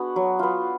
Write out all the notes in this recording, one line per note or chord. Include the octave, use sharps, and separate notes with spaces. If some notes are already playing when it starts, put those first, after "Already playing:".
Already playing: B3 D4 F#4 G#4
F#3
B3 F4